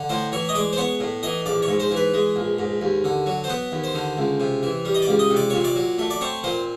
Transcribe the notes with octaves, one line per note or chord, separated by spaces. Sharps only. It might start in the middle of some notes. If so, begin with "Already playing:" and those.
Already playing: D3
A2 C5
E3 C#5
D#5
G#3 D5
C5
B3 C#5
A2
E3 D#5
A#1 D5
C#5
G#2
C5
E3
B4
G#3
A#1
G#2
D#2
D3
F#3
C5
B3 B4
D#2
C5
D3
C#2
C3
E3
G3
D#5
D5
C#2
D#5
C3
D5
A#2 C#5
D5
F#3
A3
D5
C4 C#5
A#2 C5